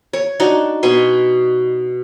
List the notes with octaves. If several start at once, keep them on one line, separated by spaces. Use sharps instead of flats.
C#5
D4 D#4 F#4
B2 G#5 C6